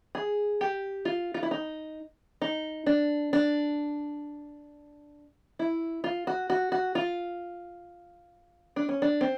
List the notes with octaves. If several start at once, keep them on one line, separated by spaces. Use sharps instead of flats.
G#4
G4
F4
F4
E4
D#4
D#4
D4
D4
E4
F4
F#4
F#4
F#4
F4
D4
C#4
D4
C4